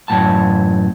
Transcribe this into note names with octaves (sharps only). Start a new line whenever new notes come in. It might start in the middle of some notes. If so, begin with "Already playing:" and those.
F#2 A2 A5